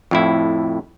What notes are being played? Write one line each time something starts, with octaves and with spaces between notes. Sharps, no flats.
F2 A2 E4